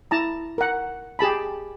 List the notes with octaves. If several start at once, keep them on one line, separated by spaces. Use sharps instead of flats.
E4 A5 A#5
A#4 F#5
G4 G#4 A5 B5